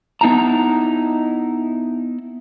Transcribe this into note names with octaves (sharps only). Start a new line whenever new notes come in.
B3 D#4 E4 A5 A#5